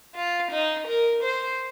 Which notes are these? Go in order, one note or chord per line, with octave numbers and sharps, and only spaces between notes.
F4
D#4
A#4
C5